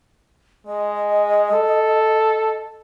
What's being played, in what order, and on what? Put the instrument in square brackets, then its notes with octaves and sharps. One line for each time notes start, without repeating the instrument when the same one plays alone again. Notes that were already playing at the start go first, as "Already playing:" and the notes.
[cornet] G#3 [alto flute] D#5
[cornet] A4